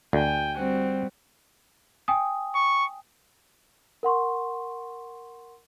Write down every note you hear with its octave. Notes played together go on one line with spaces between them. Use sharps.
D2 G5 G#5
G3 C4 F#4
G5 G#5 D#6
C#6
A#4 F#5 C6 C#6